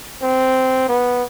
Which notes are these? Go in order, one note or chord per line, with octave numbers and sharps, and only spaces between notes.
C4
B3